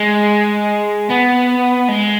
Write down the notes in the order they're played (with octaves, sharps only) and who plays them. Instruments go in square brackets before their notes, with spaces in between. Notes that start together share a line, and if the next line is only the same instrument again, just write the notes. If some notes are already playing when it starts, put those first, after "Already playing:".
Already playing: [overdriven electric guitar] G#3
B3
G#3